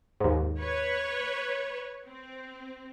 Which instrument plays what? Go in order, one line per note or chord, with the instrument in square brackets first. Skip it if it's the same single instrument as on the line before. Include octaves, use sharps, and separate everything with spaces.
[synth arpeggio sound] D#2 G#2
[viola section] B4 C#5
C4